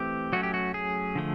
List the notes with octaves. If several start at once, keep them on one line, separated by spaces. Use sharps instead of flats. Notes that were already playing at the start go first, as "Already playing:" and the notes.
Already playing: E3 A3 C4 G4
F#3 A3 C#4 F#4
G4
F#4
G#4
D3 F3 A3